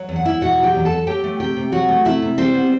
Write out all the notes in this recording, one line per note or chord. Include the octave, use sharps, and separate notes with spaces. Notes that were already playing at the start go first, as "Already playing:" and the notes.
Already playing: F#3
E2
F#5
E2 E4 E5
B2 F#4 F#5
F#3
G4 G5
E2
A4 A5
E2
F#3 G4 G5
A3
C3 G4 G5
C3
F#3 F#4 F#5
A3
C3 E4 E5
C3
G3 C4 C5
B3